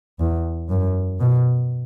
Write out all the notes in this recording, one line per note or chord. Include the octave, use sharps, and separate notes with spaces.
E2
F#2
B2